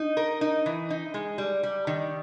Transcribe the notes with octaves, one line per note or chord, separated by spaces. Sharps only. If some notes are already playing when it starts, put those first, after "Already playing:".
Already playing: D#4
A#4
D#4
E3
D#4
G#3
G3
G3
D#3